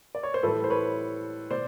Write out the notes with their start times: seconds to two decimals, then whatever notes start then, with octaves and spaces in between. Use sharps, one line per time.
0.15 D5
0.23 C#5
0.34 C5
0.43 A2 E3 G3 A4 B4
0.64 C5
0.70 B4 C#5
1.50 B2 C5 D5